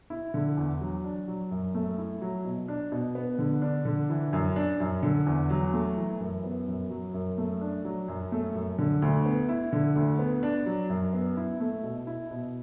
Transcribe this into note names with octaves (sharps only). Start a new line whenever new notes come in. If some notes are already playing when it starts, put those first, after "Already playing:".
E4
D3
E2
F#3
D4
F#3
F#2
A3
E4
F#3
B2
D4
B2
B3
D3
D4
D3
E3
F#2
D4
F#2
D3
E2
F#3
A3
E3
F#2
B3
F#2
F#3
F#2
A3
D4
F#3
F#2
A3
F#2
D3
D2
B3
E4
D3
D2
B3
D4
F#3
F#2
B3
E4
A3
B2
E4
B2